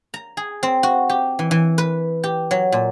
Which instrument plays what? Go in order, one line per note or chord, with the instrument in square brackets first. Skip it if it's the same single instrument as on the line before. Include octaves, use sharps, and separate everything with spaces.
[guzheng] A#5
G#4
C4
F#4
G4
E3
E3
B4
G4
F#3
A#2